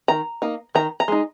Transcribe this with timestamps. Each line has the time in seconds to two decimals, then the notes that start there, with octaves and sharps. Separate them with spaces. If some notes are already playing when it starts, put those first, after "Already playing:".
0.08 D#3 A#5
0.42 A#3 D#4
0.75 D#3 A#5
1.00 A#5
1.08 G#3 D#4